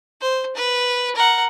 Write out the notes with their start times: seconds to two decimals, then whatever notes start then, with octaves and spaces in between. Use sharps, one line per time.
0.21 C5
0.56 B4
1.15 A#4 F#5